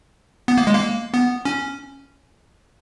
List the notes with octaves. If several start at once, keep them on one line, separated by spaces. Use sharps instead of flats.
B3
A#3
G#3
A#3
B3
C#4